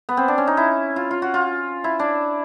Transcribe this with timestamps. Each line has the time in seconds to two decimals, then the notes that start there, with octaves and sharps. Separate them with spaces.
0.09 B3
0.17 C4
0.28 D4
0.38 C#4
0.47 D#4
0.57 E4
0.96 F4
1.11 F4
1.22 F#4
1.34 F4
1.84 E4
1.99 D4